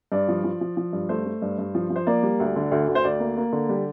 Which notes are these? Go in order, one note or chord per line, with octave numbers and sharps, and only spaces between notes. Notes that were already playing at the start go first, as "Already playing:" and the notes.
G2 D5
F3
F3
F3
F3
G2
A3 C5
A3
G2
G2
F3
F3
C5
A#3 D5
G3
D2
D3
D2
D2
C5
D2 D5
A#3
A#3
D3
G3